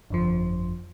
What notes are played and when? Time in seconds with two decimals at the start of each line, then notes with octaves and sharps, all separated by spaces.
0.10 G1 F2 F3